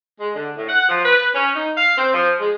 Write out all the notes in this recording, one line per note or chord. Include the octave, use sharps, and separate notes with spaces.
G#3
D3
A2
F#5
F3
B4
C#4
D#4
F5
C4
F3
G#3